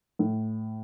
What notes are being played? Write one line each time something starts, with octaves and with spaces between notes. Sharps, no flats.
A2